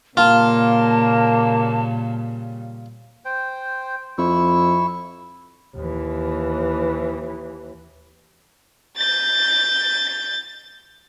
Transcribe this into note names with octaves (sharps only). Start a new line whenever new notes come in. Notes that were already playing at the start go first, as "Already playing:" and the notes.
A#2 C#3 G3 A#3 F4 A5
C5 G5
F2 E4 C#6 E6
D#2 E3
G6 A6